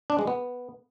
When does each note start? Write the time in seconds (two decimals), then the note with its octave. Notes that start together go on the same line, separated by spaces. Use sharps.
0.10 D4
0.19 G#3
0.27 B3